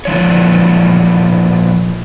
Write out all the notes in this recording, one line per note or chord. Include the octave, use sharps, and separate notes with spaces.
A#2 E3 F3 D4 C#5